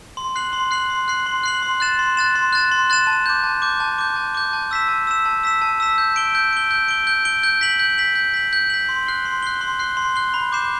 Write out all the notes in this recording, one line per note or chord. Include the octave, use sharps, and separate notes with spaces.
C6
F#6 C7 F#7
C6
F#6 C7 F#7
C6
F#6 C7 F#7
C6
F#6 C7 F#7
C6
F#6 A6 E7
C6
F#6 A6 E7
C6
F#6 A6 E7
C6
F#6 A6 E7
A5
D6 G6
A5
D6 G6
A5
D6 G6
A5
D6 G6
A5
E6 B6 E7
A5
E6 B6 E7
A5
E6 B6 E7
A5
E6 B6 E7
G6
D7 G7
G6
D7 G7
G6
D7 G7
G6
D7 G7
G6
B6 F#7
G6
B6 F#7
G6
B6 F#7
G6
B6 F#7
C6
F#6 C7 G7
C6
F#6 C7 G7
C6
F#6 C7 G7
C6
F#6 C7 G7
B5
D6 G6 C7 E7